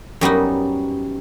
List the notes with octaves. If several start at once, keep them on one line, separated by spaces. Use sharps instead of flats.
F#2 G3 B3 D#4